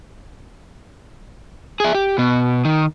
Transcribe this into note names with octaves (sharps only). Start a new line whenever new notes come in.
G#4 E5
G4
B2 B3
D#3